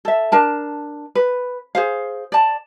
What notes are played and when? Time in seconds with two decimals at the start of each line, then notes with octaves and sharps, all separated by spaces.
0.05 A4 E5
0.32 D4 A#4 A5
1.15 B4
1.75 G#4 C5 F5
2.32 D5 A5